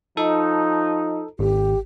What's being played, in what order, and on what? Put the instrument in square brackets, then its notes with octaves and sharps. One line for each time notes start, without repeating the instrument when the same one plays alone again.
[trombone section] F3 D#4 [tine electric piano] A4
[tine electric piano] G#1 [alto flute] G4